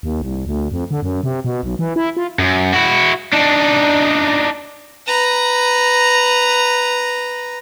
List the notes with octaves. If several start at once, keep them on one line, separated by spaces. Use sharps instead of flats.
D#2
C2
D2
F2
D3
F#2
C3
B2
B1
E3
E4
F4
F#2
E4 F#4
D4 D#4
B4 A#5